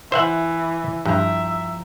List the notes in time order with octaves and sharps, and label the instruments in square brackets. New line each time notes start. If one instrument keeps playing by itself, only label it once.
[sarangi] E3 [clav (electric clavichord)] C5 E5 F#5
[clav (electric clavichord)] G2 [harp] F3 G5 A#5 [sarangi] E5